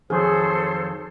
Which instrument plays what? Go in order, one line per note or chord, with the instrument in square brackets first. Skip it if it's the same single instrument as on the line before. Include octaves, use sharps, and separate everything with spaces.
[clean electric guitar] F2 D#3 F#3 [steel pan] G#4 [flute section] A4 C5 C#5